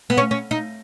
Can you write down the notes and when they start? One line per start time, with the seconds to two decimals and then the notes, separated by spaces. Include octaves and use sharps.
0.10 B3
0.17 C#4
0.31 C#4
0.51 D#4